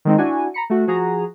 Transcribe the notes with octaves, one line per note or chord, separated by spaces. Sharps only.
D#3 G#3 C4 D#4
D4 E4 F#4 G#5
A#5 B5 C#7
A3 F#4
F3 F#4 G#4 A#5